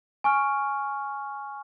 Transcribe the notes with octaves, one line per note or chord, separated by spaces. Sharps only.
G#5 C#6 F6